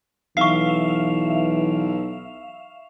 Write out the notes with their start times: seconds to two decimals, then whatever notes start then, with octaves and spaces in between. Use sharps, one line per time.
0.37 B1 E3 E5 F5 C#6 C7